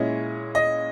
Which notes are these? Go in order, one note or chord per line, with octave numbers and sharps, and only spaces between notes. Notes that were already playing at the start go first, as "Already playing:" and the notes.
Already playing: A#2 G#3 C#4 E4 D#5
D#5